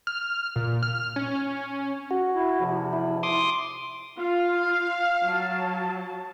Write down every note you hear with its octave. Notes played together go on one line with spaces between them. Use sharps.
F6
A#2
F6
C#4
C#4
F#4
E4
E2 C3 F3
E4
C6 D6 D#6
F4 F5
F#3 A5